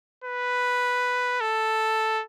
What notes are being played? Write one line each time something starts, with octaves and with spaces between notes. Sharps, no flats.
B4
A4